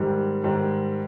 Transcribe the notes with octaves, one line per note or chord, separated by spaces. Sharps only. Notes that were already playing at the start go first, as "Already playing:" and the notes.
Already playing: G#2 D#3 G3
G#2 D#3 G3